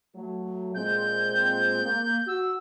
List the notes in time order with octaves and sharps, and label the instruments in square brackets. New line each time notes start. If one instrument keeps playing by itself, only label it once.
[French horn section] F#3 A3
[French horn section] A#2 G#3 C4 [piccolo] G6
[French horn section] A#3
[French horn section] F#4 [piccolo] E6